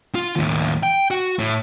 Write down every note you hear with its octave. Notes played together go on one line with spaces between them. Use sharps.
F4
D#2 A2
G5
F#4
A2